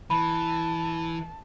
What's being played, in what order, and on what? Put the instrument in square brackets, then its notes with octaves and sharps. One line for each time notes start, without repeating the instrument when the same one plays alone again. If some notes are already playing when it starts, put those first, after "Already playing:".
[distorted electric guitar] E3 [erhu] A5 [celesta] B5